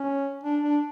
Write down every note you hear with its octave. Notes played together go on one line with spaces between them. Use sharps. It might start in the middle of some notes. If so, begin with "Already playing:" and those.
Already playing: C#4
D4
D4